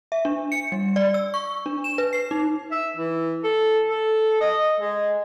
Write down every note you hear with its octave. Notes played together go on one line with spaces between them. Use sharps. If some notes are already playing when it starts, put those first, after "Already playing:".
E5
D4
C#7
G3
D5
E6
C#6
D4
E7
B4
C7
D#4
E5
E3
A4
A4
D#5
G#3